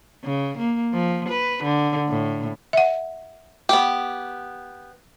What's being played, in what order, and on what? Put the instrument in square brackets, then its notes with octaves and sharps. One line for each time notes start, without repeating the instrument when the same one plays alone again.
[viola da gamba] C#3
A#3
F3
B4
D3
A2
[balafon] E5 F#5
[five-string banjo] B3 G4